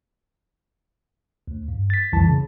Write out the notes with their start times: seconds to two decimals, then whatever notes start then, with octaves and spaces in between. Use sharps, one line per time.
1.48 D2
1.68 G2
1.90 A6 B6
2.13 C2 F2 E3 E4 A5 A6
2.28 C#3